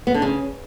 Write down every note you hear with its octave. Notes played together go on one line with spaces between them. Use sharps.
B3
D3
C#3